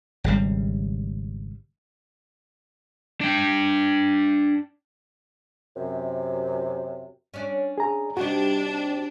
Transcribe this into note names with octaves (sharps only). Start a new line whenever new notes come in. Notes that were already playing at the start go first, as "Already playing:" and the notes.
G#1 C#3 G3
D4 G5
F#2 C3
C#4 D4 D5
G#4 A#5
C3 G3 D4 D#4 F#4